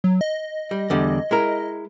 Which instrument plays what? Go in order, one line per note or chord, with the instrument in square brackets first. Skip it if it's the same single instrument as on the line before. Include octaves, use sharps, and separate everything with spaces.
[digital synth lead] F#3
D#5
[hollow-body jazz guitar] G3
E2 D3 G3
G#3 E4 A#4